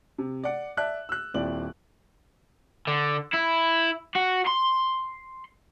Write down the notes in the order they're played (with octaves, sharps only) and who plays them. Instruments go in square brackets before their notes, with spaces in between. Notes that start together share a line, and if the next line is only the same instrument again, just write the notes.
[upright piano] C3
D5 F#5
D5 E5 A5 F#6
E6 F#6
D#1 C4 E4 D5 F#7
[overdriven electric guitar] D3
E4
F#4
C6